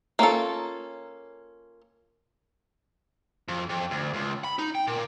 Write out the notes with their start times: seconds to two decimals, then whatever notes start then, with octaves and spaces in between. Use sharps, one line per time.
0.19 A#3 C#4 F4 A4
3.48 F2
3.69 F2
3.91 D2
4.14 C#2
4.44 B5
4.59 D#4
4.75 G5
4.87 A#2